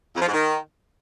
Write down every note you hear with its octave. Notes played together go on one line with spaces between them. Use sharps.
F2
F3
G#2
D#3